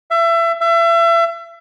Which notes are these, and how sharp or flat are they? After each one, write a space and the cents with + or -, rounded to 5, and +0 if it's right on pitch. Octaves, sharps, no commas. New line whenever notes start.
E5 +30
E5 +35